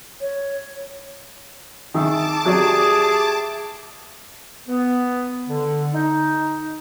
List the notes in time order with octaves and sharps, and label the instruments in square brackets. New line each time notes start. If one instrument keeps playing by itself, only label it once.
[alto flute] C#5
[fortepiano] D#3 [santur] G#4 E5 C#6 [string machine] A5 D6
[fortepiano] F#3 D5 [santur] A3 G4 [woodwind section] G#4
[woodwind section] B3
D3
D#4